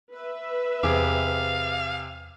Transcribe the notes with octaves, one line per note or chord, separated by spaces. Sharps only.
B4 E5
E2 C3 G#4 F5 D6